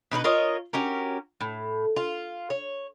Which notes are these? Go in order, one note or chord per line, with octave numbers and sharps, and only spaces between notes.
B2 D#4 A#4 B4
F4 A#4 C#5 D#5
C#4 F#4 G4 A#4
A2
F4
C#5